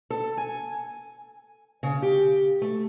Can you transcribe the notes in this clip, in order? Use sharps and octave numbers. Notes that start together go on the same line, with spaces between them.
A4
G#5
C#3
G4
A3